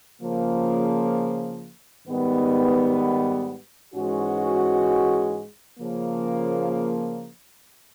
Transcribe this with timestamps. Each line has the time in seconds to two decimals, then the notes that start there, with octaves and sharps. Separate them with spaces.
0.22 C#3 F3 A#3
2.08 G#2 D#3 G3 B3
3.94 G#2 E3 G#3 C#4 F#4
5.80 C#3 F3 A#3